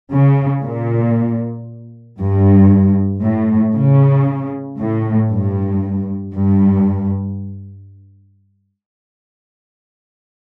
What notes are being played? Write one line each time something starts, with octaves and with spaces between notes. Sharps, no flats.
C#3
A#2
G2
A2
C#3
A2
G2
G2